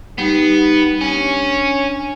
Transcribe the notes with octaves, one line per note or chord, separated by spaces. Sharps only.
G3 B3 D#4 G4
C#4 D4